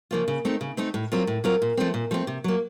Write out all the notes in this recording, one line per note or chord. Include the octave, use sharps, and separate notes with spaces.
C#3 F3 A#3 F4
C#3
A3 C4 D#4
C#3
A3 C4 D#4
A2
F#3 C4 F4 A#4
A2
F#3 C4 F4 A#4
A#2
F3 A3 C4
A#2
F3 A3 C4
C3
F#3 A#3